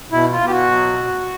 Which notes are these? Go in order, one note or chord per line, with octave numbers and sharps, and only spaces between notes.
B2 E4
F4
B2
G4
F#4
F#3